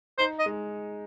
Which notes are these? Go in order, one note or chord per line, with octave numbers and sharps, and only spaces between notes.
D#4 C5
D#5
G#3